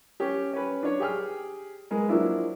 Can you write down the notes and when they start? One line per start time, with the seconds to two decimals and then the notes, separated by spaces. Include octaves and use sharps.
0.20 C#4 G4
0.53 C#4 B4
0.83 D4 C#5
1.00 G4 G#4 G5 F6
1.91 G#3 A#4 B4
2.09 F3 F#3 A#3 D4 E4